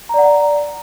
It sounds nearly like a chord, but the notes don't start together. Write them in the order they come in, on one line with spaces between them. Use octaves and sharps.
A#5 D5 F#5